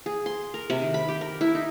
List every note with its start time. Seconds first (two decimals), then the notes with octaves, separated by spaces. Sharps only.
0.06 G#4
0.26 C6
0.54 A#4
0.70 C3
0.82 D#3
0.94 B5
1.09 G4
1.21 A#4
1.41 E4
1.55 D#4